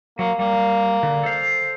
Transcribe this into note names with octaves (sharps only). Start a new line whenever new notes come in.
F#3 A#3
G3 A#3
D3
A4 C5 F5